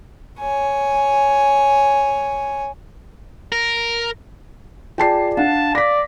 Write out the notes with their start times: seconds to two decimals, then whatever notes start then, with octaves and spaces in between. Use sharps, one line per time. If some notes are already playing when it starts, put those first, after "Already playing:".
0.40 C#5 G#5
3.52 A#4
4.98 F4 G#4 D5 G5 A5 C7
5.37 D4 F5 F#5 A5
5.75 D5 A#6 B6